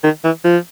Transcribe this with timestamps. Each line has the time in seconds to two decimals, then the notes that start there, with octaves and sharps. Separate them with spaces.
0.03 D#3
0.24 E3
0.44 F3